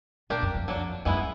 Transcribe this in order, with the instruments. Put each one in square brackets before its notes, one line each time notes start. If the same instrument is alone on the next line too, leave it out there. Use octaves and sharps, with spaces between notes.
[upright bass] B2 [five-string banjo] A#3 D4 G4 A#4
[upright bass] F#2
F2
[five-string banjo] F#3 A#3 D4
[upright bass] F#2 [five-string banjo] E3 G#3 B3 E4